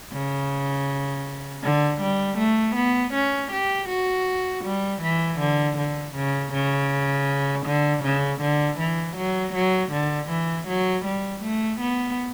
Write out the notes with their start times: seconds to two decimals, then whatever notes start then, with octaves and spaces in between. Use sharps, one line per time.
0.13 C#3
1.63 D3
2.01 G3
2.38 A3
2.76 B3
3.14 C#4
3.52 G4
3.89 F#4
4.65 G3
5.02 E3
5.40 D3
5.78 D3
6.15 C#3
6.53 C#3
7.66 D3
8.04 C#3
8.41 D3
8.79 E3
9.17 F#3
9.54 F#3
9.92 D3
10.29 E3
10.68 F#3
11.05 G3
11.43 A3
11.81 B3